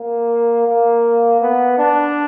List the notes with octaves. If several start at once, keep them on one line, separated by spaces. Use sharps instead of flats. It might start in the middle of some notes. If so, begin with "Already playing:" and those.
Already playing: A#3
A#3
B3
D4